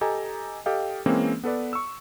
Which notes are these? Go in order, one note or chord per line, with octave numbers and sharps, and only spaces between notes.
G4 A4 D#5 G#5 A#5
G4 A4 D#5 F5 G5
E3 G#3 A#3 C4 C#4
B3 A4 B4 D5
C#6 E6